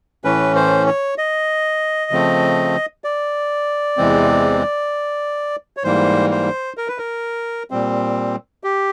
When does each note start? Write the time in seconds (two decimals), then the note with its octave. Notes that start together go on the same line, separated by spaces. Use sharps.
0.24 A2 E3 A3 C#4 B4
0.55 C5
0.87 C#5
1.18 D#5
2.11 C#3 F3 A3 C4
3.04 D5
3.97 E2 C3 E3 G#3 C4
5.77 C#5
5.84 G#2 E3 G3 A#3 C5
6.31 C5
6.78 A#4
6.88 B4
6.98 A#4
7.71 A#2 G3 C4
8.64 G4